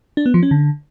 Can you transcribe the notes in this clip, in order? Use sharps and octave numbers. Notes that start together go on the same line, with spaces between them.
D4
B3
F3
C#4
D3